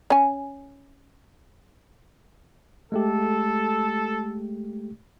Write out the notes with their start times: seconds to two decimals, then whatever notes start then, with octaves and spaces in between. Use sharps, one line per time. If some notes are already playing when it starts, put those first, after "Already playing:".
0.10 C#4 G#5
2.92 G#3 A3 G4 A4